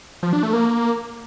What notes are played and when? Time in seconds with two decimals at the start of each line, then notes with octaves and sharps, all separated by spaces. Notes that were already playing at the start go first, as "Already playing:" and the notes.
0.23 F3
0.33 D4
0.43 A3
0.53 A#3